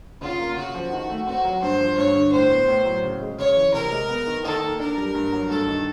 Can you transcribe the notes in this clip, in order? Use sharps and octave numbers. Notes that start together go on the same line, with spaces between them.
C#3 F4
A#3
C#3 F#4
F3
D#3
A3
C4 F#4
F#3
G2 C5
F3
G2 C#5
D3
A2 C5
B3
A2
F#3
C#3
G#3
C#3 C#5
E3
C3 A#4
G#3
B3
D#3
D#3 A4
A#3
D4 A#4
G3
G2
F#3
G2 A4
D#3